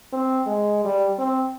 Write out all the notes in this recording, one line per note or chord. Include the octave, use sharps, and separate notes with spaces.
C4
G#3
G3
C4